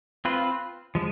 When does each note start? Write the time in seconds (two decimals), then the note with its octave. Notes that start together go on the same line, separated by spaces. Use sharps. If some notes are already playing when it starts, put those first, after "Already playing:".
0.25 C4 F4 B4
0.95 F3 G#3